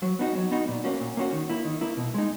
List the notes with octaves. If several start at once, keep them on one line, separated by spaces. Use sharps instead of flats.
F#3
B3 D#4 F#4
F#3
B3 D#4 F#4
A#2
A#3 C#4 F#4
A#2
A#3 C#4 F#4
D#3
A#3 E4
D#3
A#3 E4
B2
G#3 D#4